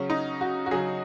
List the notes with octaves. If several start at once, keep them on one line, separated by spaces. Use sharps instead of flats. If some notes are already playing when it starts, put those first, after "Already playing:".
Already playing: C#3 F#3 C#4
D#4
F#4
F#4
C#3 F#3 G#4